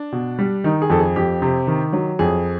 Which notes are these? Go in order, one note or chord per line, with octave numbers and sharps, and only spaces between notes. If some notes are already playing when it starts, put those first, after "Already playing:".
Already playing: D4
B2
G3
D#3 D#4
G#4
F2 A4
G#4
F2 G4
C3
D#3
F#3
F2 G#4